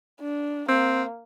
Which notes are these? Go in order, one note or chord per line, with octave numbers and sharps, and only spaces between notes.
D4
A#3 C4